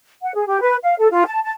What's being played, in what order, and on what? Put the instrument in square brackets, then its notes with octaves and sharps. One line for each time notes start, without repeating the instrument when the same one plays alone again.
[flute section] F#5
G#4
G4
B4
F5
A4
F4
A5
A5